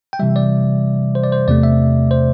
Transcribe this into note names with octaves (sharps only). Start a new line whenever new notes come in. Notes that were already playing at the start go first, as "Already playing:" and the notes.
G5
C3 E3 G3 E5
D5
C5
D5
C5
E2 C3 A3 D5
E5
C5